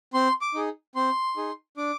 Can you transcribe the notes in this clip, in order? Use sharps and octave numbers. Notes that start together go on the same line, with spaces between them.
C4 C6
D6
D#4 G#4
C4 C6
D#4 G#4
D4 D6